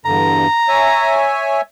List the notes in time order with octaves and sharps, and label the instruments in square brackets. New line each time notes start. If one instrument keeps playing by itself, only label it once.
[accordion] E2 G2 D3 [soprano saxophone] A#5
[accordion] C#5 E5 G#5